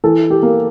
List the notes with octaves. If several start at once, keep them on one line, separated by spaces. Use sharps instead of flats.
E3 A4
G4
A#3